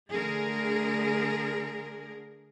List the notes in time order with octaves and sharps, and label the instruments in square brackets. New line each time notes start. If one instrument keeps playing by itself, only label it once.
[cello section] D3 A3 G#4 A#4